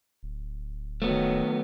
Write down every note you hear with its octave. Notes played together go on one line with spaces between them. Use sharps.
D1
D#3 F#3 A3 B3